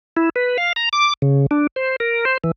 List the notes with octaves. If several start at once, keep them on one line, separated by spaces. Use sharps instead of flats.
E4
B4
F5
A#5
D6
C#3
D4
C5
A#4
C5
E3